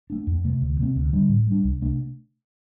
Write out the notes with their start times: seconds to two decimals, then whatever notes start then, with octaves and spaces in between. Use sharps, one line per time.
0.10 A3 D4
0.27 F2
0.44 C3 A3
0.61 D2
0.79 C3 A3 C4
0.96 D2
1.13 D3 G3 D4
1.29 A2
1.47 G3 D4
1.64 C2
1.82 C3 A3 D4